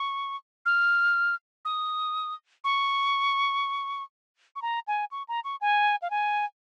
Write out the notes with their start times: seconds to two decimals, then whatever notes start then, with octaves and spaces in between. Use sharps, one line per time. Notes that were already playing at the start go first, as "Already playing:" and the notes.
Already playing: C#6
0.66 F6
1.65 D#6
2.64 C#6
4.56 C#6
4.62 A#5
4.88 G#5
5.11 C#6
5.28 A#5
5.44 C#6
5.61 G#5
6.02 F5
6.10 G#5